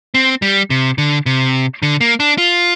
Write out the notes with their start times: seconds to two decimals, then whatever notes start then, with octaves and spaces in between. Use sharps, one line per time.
0.14 C4
0.42 G3
0.70 C3
0.98 D3
1.26 C3
1.83 D3
2.01 A#3
2.20 D4
2.38 F4